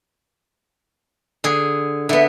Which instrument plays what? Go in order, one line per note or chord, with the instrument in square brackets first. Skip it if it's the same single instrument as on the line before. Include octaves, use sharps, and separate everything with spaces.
[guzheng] D3 G#4
[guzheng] D3 B3 [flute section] E5